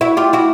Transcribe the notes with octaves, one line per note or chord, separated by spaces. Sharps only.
E4 F#4
F4 G4
E4 F#4